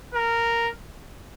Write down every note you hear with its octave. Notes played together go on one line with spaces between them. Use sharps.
A#4